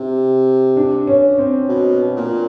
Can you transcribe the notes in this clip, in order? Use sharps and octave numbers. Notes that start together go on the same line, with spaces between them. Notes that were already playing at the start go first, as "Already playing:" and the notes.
Already playing: C3
D4
C#4
C4
B2
A#2